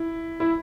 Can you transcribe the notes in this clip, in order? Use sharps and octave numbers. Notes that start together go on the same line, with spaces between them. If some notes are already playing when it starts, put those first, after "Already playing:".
Already playing: E4
E4